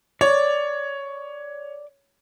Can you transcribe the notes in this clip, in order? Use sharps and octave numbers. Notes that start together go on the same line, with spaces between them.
C#5 D5